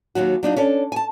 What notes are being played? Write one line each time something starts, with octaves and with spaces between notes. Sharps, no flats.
D#2 D#3 F#3 F#4
F#3 D4 D#4 F4
C#4 D4 A4
G#5 A5